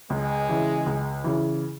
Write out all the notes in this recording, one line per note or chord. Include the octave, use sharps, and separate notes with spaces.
C#2 G#3
C#3 E3
C#2
C#3 E3